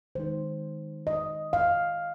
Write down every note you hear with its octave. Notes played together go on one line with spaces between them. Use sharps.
D#3 G#3 D#4 C5
D#5
F5